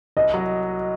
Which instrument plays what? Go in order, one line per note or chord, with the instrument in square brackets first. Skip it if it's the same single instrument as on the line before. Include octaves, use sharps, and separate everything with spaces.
[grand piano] C2 [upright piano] D#5
[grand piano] F#3